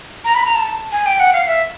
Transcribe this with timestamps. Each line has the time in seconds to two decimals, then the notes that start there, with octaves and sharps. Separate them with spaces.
0.25 A#5
0.35 B5
0.45 A#5
0.55 A5
0.92 G#5
1.06 G5
1.20 F#5
1.33 F5
1.47 E5